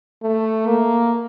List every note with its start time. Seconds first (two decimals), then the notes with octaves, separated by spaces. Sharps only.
0.23 A3
0.66 A#3